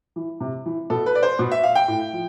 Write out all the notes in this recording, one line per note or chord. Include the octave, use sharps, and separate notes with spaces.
E3
C3
E3
B2 A4
B4
D5
C5
B2
E5
F5
G5
A2
F3